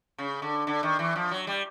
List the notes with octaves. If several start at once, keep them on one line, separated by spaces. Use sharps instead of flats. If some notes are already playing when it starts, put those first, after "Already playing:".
C#3
D3
D3
D#3
E3
F3
F#3
G3